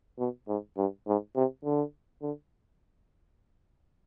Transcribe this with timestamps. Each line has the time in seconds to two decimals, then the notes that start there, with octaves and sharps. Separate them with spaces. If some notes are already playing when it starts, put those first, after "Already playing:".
0.19 B2
0.48 G#2
0.77 G2
1.07 G#2
1.36 C3
1.64 D3
2.22 D3